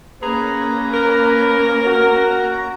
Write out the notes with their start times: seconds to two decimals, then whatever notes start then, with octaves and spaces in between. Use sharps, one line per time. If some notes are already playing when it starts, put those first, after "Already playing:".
0.23 A#3 C#4 G#4 B4 A#5
0.94 A#4
1.86 F#4